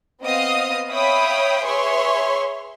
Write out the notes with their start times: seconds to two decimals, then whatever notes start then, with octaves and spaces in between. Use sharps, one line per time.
0.23 B3 C4 D#5 F5 D#6
0.91 C#5 E5 F5 G5 B5 D#6
1.64 G#4 B4 C#5 E5 C6 C#6